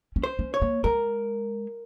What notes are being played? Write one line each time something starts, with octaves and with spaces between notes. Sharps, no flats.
C#4
C5
C#4
C#5
A#3
G#3 A#4